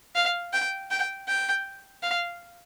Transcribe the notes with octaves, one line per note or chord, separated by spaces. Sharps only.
F5
G5
G5
G5
F5